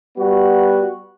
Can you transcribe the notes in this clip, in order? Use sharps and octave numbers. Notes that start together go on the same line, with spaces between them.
G3 B3 F#4